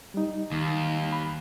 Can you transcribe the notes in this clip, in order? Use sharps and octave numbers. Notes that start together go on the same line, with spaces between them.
G3 D#4
D#2
B5